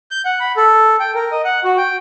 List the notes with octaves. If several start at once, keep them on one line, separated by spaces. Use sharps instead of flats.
G6
F#5
B5
A4
G5
A#4
D#5
F#5
F#4
G5